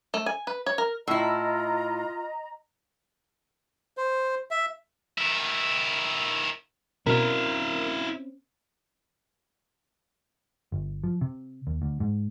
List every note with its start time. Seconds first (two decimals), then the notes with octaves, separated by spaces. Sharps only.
0.14 A3
0.26 G#5
0.47 B4
0.66 C#5
0.78 A#4
1.08 A2 E4 F4 D#5 A#5
3.97 C5
4.51 E5
5.18 D#3 E4
7.06 B2 C4 C#4 E4 A#4 F5
10.72 G1
11.04 F3
11.21 C3
11.67 D#2
11.82 D2
12.00 G#2